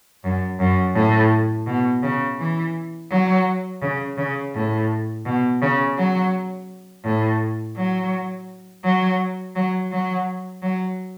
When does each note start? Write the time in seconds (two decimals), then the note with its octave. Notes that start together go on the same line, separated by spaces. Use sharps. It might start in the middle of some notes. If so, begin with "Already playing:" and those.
0.24 F#2
0.60 F#2
0.95 A2
1.67 B2
2.03 C#3
2.39 E3
3.11 F#3
3.82 C#3
4.17 C#3
4.54 A2
5.25 B2
5.62 C#3
5.97 F#3
7.05 A2
7.76 F#3
8.84 F#3
9.56 F#3
9.91 F#3
10.62 F#3